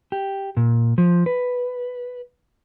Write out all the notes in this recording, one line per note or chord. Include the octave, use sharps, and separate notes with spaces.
G4
A#2
F3
B4